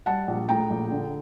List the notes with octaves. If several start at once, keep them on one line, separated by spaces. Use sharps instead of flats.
G3 F#5 A5
A#1
A2 G5 A#5
A#1
D3